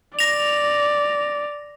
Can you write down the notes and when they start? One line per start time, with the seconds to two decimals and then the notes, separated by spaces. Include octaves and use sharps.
0.19 D5 A#6 F7